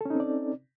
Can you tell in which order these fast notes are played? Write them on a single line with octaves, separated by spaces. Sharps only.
A4 C#4 D#4 C4 D5